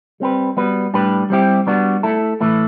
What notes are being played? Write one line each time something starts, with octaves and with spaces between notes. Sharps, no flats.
G3 C4 G4 B4
G3 B3 F#4 B4
A2 G3 D4 G4 B4
G3 C4 E4 G4
G3 B3 D4 F#4
A3 E4 A4
A2 E3 A3 E4